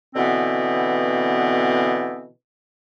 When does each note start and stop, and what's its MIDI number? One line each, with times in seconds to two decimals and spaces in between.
0.15 2.29 47
0.15 2.29 50
0.15 2.29 52
0.15 2.29 59
0.15 2.29 60